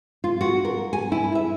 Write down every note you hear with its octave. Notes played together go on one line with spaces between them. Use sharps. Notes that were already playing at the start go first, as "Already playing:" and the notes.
F4
F#4
A#4
G#5
E4
E5